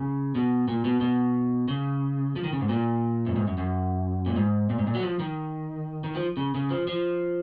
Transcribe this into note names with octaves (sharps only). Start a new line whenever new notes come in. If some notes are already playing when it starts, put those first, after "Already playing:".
Already playing: C#3
B2
A#2
B2
B2
C#3
F3
D#3
C#3
G#2
A#2
F#2
G#2
F#2
F#2
A#2
G#2
A#2
G#2
A#2
F#3
F3
D#3
D#3
F3
C#3
C#3
F3
F3